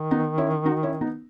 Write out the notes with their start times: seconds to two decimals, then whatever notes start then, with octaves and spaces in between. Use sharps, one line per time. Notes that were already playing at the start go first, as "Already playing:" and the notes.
Already playing: D#3
0.11 B3 D#4
0.38 C#4 E4
0.65 D#4 F#4
0.83 C#4 E4
1.01 B3 D#4